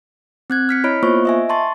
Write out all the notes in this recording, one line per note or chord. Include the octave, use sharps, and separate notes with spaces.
C4 F#6 G#6
F6 B6 C#7
E4 C#5 D#5 B5 F6 D7
A#3 B3 F4 C5 D#5 C#6
D#5 E5 G#5
A5 C6 C#6 A6